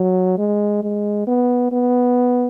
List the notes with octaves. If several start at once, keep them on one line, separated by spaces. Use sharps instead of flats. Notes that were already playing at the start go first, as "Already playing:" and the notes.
Already playing: F#3
G#3
G#3
B3
B3